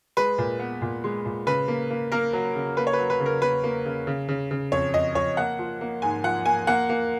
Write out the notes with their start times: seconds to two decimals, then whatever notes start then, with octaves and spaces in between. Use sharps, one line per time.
0.17 G#3 B4
0.38 A#2
0.59 B3
0.82 A#2
1.04 G#3
1.25 A#2
1.46 C#3 B4
1.68 A#3
1.90 A#3
2.12 A#3 A#4
2.33 F#3
2.55 C#3
2.77 A#3 B4
2.87 C#5
2.93 B4
2.98 F#3
3.10 B4
3.20 C#3
3.26 A#4
3.42 A#3 B4
3.64 A#3
3.86 C#3
4.07 C#3
4.28 C#3
4.51 C#3
4.72 F2 C#5
4.94 F2 D#5
5.15 F2 C#5
5.37 A#3 F#5
5.59 F3
5.81 A#3
6.02 G#2 G#5
6.24 F3 F#5
6.46 A#3 G#5
6.67 A#3 F#5
6.89 A#3